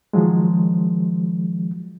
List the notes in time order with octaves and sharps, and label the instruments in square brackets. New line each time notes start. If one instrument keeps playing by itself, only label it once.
[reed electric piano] D#3 F3 F#3 G#3